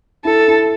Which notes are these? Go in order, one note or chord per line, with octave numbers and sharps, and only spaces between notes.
E4 A4
E4